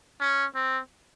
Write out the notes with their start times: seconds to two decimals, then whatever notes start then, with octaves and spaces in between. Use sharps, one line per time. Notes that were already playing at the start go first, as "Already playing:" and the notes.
0.21 C#4
0.55 C4